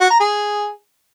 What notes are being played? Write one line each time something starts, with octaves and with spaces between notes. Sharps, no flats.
F#4
A#5
G#4